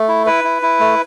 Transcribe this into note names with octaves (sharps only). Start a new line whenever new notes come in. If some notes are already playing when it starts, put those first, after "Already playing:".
Already playing: A3
E4
E4 B4
E4
E4
A3